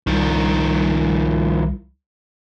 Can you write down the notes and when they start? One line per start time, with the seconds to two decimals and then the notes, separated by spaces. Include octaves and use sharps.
0.07 C2 D#3 F3